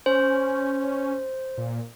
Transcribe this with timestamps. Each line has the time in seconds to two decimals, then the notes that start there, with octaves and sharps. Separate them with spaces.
0.06 C#4 C5
1.58 A#2